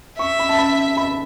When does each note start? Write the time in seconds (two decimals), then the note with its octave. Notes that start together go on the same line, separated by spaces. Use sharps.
0.19 E5 C#6
0.39 B5
0.49 A5
0.58 B5
0.97 B5